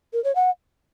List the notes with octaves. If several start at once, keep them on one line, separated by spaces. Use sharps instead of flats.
A#4
C#5
F#5